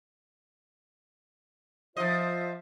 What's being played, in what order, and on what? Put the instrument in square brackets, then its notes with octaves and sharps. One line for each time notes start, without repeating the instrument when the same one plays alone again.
[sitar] F3 D#5 [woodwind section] F4 C5 E5